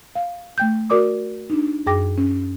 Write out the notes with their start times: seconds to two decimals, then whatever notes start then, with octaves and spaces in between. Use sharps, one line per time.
0.15 F5
0.58 A3 G5 G6
0.90 F#4 A#4 D5 D6 D#6
1.50 D4 D#4
1.86 F#2 G#4 G5 D6 A#6
2.18 C#4